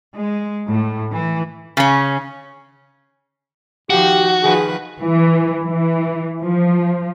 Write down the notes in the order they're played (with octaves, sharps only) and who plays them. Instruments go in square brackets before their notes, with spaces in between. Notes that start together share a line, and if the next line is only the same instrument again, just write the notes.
[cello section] G#3
A2
E3
[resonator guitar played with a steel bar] C#3 C#4
[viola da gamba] D#3 F3 [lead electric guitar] F#4 [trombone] G4
[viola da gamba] D#3 F3 B4 [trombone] G#4
[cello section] E3
E3
F3